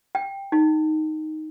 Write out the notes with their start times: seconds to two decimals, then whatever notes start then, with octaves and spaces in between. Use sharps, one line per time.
0.15 G5
0.52 D#4